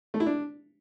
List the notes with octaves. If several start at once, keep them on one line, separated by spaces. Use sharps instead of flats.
A3
E4
D4